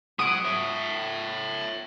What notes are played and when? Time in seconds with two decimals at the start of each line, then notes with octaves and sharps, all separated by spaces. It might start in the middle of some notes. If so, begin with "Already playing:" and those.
0.19 F#3 F#5 D#6 D7
0.45 C#5 E5